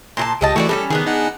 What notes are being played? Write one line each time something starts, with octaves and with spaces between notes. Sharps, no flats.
A#2 F4 A5 C6
C#2 G4 D#5 A5
E3 A3 F#4 G4 D5
G3 C4 C#4 A4
D#3 B3 D4 G#4
D#4 F#5